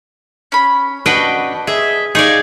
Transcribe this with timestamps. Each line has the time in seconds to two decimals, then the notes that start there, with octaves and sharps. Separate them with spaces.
0.52 C#4 B5
1.06 C#4 D4 F#4 B4 D#5 G5
1.67 G#4 D#5 E5
2.15 D#4 G#4 C#5 D5 F5